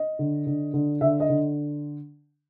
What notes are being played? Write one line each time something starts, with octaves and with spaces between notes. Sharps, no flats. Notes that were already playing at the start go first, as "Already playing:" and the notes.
Already playing: D#5
D3
D3
D3
D3 E5
D#5
D3